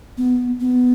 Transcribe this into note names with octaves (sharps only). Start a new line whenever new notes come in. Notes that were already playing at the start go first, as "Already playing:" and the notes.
B3
B3